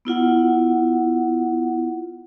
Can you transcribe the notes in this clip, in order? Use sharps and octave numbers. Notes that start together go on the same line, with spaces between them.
B3 E4 F4 F#5